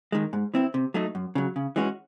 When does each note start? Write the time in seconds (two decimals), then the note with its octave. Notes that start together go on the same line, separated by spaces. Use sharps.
0.12 D#3 G#3
0.33 G#2
0.54 E3 C4 E4
0.74 C3
0.94 F#3 A3 D#4
1.15 F#2
1.35 C#3 F#3
1.56 C#3
1.76 E3 G#3 C#4 F#4